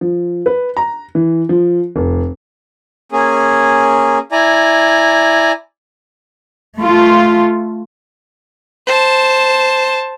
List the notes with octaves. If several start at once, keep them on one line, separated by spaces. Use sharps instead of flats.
F3
B4
A#5
E3
F3
F1
A#3 C#4 G#4
E4 D5 G#5 A#5
A3 F4
C5 A5